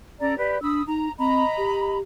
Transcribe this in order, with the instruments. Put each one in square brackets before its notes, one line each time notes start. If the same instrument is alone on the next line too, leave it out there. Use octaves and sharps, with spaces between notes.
[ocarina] C#4 [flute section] A4 D5 A#5
[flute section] G4 B4 [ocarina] D5
[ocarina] D4 [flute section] B5 D#6 E6
[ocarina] D#4 [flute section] A#5
[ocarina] C4 [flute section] D#5 A#5 B5
[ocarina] G4